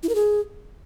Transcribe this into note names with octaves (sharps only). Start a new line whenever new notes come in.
E4
A#4
G#4